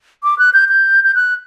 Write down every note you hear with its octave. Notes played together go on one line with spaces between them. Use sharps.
D6
F#6
G6
G6
G6
F#6